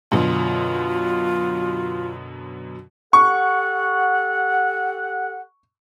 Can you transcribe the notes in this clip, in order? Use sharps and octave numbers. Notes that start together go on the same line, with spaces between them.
F#2 B2 D3 F4
G4 A4 F#5 C#6